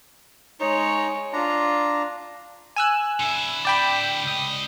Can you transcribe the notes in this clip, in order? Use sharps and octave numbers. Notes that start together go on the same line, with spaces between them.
G#3 D#4 C#5
D4 F4 A#5
G#5 E6 F#6
D3 E4
D5 G5 B5
C#2 D#5